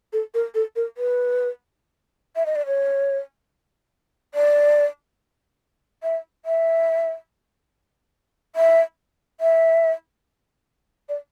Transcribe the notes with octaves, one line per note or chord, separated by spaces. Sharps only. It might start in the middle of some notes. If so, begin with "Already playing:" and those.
A4
A#4
A4
A#4
B4
E5
D#5
D5
C#5
D5
E5
E5
E5
E5
D5